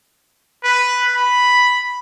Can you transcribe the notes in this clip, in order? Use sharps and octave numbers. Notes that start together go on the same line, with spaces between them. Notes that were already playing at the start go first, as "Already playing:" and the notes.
B4
B5